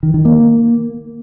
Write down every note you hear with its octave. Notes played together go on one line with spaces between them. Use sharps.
D#3
D#3
A#3